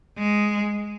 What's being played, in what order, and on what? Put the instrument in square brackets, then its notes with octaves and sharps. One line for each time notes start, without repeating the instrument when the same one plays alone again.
[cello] G#3